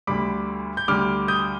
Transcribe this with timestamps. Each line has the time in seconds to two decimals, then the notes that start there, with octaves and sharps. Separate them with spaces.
0.07 D2 D3 G3 B5 D6
0.77 G6
0.88 D2 D3 G3 D6 F6
1.28 D#6 G6